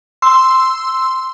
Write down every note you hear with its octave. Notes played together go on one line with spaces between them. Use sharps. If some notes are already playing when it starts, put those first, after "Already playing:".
C6 E6